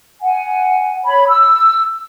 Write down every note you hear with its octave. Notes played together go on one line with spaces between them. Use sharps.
F#5 G#5
C#5 B5
E6